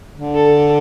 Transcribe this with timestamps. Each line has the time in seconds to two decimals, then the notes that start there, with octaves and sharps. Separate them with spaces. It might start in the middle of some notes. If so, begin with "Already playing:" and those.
0.13 D3
0.34 A4